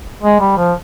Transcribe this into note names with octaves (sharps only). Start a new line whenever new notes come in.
G#3
G3
F3